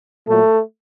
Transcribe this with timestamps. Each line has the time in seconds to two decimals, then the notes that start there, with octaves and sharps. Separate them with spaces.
0.27 A#2 F#3 A3